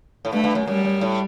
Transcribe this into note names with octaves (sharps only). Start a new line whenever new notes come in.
A2
G2 A3
G2
F#2
F#2 G3
F#2
A2